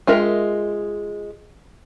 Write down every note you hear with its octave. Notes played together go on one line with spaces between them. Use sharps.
G#3 F4 A#4 E5